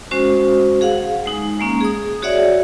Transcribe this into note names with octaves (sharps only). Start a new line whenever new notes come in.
G#3 C#4 F#4 C5
G#4 F5 F#5
G#3 D#4 G#5
G#3 A#3 C#4
G#4 D#6
F#4 G#4 C#5 D5 E5 F#5